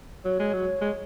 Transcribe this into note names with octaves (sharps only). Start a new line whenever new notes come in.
F#3 C#5
G#3
F#3
G#3